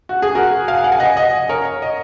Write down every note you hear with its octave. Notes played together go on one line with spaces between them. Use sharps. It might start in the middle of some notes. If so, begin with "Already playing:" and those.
F#4
G#4
F#4 A#4
F5 G#5
F#5
G#5
D#5 F#5
D#5 F#5
A#4 C#5
D#5